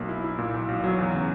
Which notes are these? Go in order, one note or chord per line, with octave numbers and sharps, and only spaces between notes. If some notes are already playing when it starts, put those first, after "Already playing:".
Already playing: B1 A#3
E4
E4
A#2
B1
B1
F#3
E2
C#3